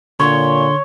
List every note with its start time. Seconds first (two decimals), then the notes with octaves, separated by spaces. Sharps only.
0.20 A#2 D3 C#5 C6